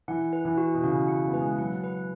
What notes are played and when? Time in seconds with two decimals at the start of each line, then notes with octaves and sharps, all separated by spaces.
0.08 E3 F#5
0.33 B4
0.45 E3
0.58 F#4
0.74 B2
0.83 C#3 F#4
1.08 F#5
1.28 B3
1.34 G#3 B4
1.58 F#3 F#5
1.84 B4